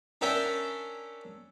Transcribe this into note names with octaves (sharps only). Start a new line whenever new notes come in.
C#4 D4 A#4 E5 G5